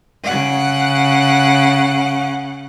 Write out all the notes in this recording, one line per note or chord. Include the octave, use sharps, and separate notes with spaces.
C#3 F#5